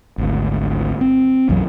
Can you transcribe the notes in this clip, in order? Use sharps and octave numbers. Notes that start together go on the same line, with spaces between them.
G#1 D2
C4
B1 F#2 E3 F#3